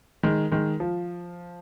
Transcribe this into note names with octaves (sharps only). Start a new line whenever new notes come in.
D#3 G#3
D#3 G#3
F3